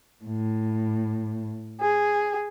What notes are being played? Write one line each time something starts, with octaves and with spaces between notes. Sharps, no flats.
A2
G#4